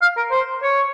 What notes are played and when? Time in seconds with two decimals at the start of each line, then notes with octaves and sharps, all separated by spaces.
0.02 F5
0.17 A#4
0.31 C5
0.62 C#5